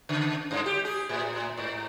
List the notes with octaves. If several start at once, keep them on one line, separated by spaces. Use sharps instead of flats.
C#3
G2
G4
G#4
A2
G#2